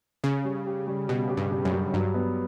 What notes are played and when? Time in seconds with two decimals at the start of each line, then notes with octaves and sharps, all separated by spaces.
0.24 C#3 C#4
0.44 G3
0.67 G4
0.87 G3
1.08 B2 G3
1.29 G4
1.37 G2
1.51 G3
1.65 F#2
1.72 G3
1.93 G2 F#3
2.14 B3